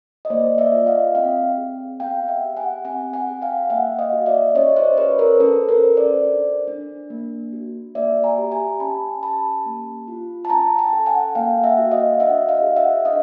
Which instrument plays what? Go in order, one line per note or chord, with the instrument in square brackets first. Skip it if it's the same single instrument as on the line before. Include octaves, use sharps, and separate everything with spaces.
[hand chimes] D#5
A#3 C5 D5
D5 E5
F4
D#5 F5
C4 F5 G5
G#4
B3 F5 G5
E5 F#5
G4
F#5 G#5
C4 F#5 G#5
F#5 G#5
G#4
F5 G5
A#3 E5 F#5
D#5 F5
F#4
D5 E5
C#4 C#5 D#5
C5 D5
G#4 B4 C#5
A#4 C5
C#4 A4 B4
A#4 C5
A4
C5 D5
D4
D4
A#3
F#4
A#3 D5 E5
G#5 A#5
G4
G#5 A#5
C#4 A5 B5
G4 A5 B5
A#3
F4
A5
C#4 G#5 A#5
G5 A5
A4
F#5 G#5
A#3 F5 G5
E5 F#5
F#4
D#5 F5
D4 E5 F#5
D#5 F5
G#4
E5 F#5
D4 D#5 F5